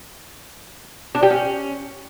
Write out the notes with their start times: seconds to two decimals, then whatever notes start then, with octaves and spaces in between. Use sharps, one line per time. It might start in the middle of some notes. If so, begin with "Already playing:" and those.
1.15 D4
1.23 G4
1.30 C#4